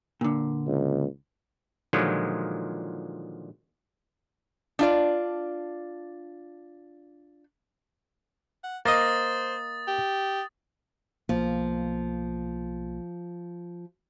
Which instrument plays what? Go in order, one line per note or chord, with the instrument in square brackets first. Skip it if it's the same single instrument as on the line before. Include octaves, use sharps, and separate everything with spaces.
[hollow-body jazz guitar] A#2 D3
[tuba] C#2
[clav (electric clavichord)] A#2 D3 D#3 F3 F#3 G#3
[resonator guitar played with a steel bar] D4 F4 D5
[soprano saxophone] F#5
[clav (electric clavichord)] A#3 D#5 [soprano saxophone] C5 [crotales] D#6 A6
[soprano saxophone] G4
[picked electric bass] B1 A#3 [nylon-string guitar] F3